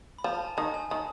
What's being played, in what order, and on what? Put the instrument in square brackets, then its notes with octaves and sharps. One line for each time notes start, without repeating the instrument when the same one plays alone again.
[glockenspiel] B5
[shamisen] F3 [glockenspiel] A#5
[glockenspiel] A5
G#5
[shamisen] D#3 [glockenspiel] A5
[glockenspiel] G#5
[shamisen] D#3 [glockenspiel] A5